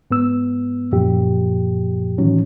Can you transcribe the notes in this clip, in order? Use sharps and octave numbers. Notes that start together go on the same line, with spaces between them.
G#2 B3 E6
F#2 A#2 F3 G4
A2 D#3 E3 F#3 C#4